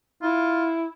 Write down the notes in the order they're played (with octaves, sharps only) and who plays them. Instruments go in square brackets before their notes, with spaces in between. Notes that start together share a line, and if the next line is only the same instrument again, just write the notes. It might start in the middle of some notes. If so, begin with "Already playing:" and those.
[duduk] E4 [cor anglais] F4